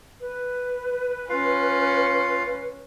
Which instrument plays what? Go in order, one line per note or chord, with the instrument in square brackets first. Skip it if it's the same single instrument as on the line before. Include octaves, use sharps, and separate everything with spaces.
[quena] B4
[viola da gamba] C#4 [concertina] F4 F5